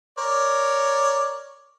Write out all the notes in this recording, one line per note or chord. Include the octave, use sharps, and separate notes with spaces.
A#4 C#5 D5